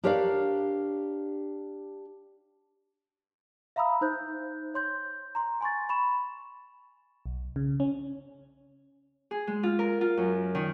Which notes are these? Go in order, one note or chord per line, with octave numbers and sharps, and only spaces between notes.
D4 G4 A#4 C#5 D5 F5
E5 F5 A#5 B5 D#6 E6
D#4 C5 G6
C#5 C6 G6
A#5 C6
G#5 C6 C#6 A6
B5 C#6 E7
B1
C#3
C#4
G#4
G#3
F4
A#4
F4
F#2
D#3